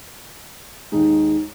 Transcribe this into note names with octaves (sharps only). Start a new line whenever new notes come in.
D#2 D#3 G#3 D#4